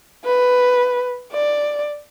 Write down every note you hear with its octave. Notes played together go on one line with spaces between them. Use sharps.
B4
D5